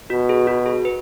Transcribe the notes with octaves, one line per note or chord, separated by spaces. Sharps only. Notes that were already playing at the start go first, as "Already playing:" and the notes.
B2 F#4
G#4
F#4
G#4
B4